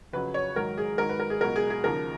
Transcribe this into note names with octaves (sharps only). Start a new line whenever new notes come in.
F2 C#3 F#3 B4
C#5
G#2 D#3 F#3 A#4
G#4
G#2 D#3 F#3 A#4
B4
A#4
G#4
C#2 B2 F#3 A#4
G#4
G#4
D#2 C#3 F3 A#4